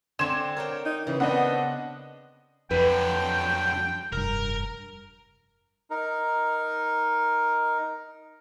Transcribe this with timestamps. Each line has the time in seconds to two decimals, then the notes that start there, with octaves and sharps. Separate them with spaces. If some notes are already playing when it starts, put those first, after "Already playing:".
0.19 D3 C4 C6 G#6 E7
0.57 A#4 C#5 G5
0.86 D#4
1.07 C#3 E3
1.20 B3 C4 D4 D#5 F#5
2.71 F2 D3 F#3 B4 G5
4.12 F1 G2 A#4
5.90 D#4 A#4